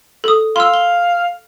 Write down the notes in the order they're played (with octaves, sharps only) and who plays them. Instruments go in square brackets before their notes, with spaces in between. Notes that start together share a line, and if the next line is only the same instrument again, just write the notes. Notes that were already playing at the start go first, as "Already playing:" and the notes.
[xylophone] A4 D#6
[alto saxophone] F5 [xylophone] C6 E6
[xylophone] G7